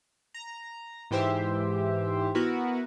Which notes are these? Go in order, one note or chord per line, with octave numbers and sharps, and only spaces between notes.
A#5
G#2 E3 G4 C5 E5
B3 E4 F#4 A#4 B4